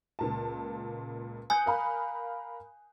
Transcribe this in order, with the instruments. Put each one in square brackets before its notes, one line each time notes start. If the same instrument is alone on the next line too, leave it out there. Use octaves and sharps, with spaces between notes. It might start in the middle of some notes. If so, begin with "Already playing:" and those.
[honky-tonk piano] C#2 A#2 A5
[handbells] G#5 [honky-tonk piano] D#6 F#6 G6
[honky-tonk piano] A#4 F5 B5